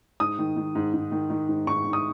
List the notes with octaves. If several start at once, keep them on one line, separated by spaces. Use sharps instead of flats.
G#2 D#6
D#3
D#3
G#2
G#2
D#3
D#3
G#2
G#2 C#6
D#3
D#6